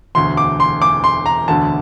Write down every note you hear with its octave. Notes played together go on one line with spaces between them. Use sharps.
E1 D2 D3 C6
D6
C6
D6
C6
A#5
E1 D2 D3 A5